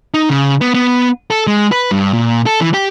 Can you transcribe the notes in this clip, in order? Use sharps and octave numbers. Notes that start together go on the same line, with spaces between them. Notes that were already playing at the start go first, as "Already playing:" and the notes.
D#4
C#3
B3
B3
A4
G#3
B4
G2
A#2
A4
E3
G4